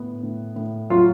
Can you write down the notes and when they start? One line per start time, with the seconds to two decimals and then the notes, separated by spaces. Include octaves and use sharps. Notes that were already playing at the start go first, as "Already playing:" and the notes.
Already playing: A2 B3
0.23 A2
0.56 A2
0.90 F#3 F4